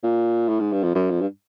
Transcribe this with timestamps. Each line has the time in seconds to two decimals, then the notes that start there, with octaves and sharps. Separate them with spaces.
0.03 A#2
0.48 A2
0.60 G#2
0.72 G2
0.83 F2
0.95 F#2
1.10 F2
1.21 G2